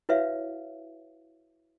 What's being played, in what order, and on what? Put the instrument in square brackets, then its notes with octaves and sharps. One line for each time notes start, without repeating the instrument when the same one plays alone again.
[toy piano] E4 F#4 B4 C#5 E5 F5